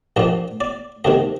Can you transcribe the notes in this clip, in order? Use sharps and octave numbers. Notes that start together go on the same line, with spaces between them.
A#1 A#2 F3 D#5
D5
D2 C3 D#3 D#5